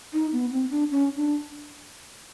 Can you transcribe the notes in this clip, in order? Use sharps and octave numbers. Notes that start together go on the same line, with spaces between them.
D#4
B3
C4
D4
C#4
D4